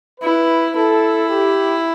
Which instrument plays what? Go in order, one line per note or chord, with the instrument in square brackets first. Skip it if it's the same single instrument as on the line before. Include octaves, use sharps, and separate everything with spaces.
[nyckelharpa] E4 [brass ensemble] B4
[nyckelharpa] E4 [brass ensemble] A4
[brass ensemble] G4